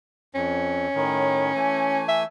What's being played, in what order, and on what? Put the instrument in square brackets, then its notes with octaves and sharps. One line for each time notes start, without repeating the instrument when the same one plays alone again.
[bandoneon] F2 [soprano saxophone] C#4
[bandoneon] A2 D#3
E3 A3 G#5
[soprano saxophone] E5